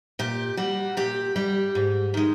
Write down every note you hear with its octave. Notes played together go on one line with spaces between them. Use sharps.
A#2 G4
G3 F#4
A#2 G4
G3 G4
G#2
D#3 G#3